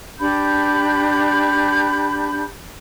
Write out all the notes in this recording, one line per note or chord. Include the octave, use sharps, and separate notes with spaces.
D4 G4 B5 G6